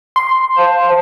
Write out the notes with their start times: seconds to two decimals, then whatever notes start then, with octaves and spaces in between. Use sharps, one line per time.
0.16 C6
0.57 C5 F5 A5